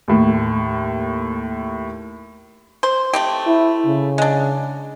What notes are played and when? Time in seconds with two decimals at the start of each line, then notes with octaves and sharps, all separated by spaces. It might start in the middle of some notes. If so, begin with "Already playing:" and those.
0.08 D#2 A2
2.83 C5
3.13 A3 C4 G4
3.47 E4
3.87 C#3
4.18 G#3 D4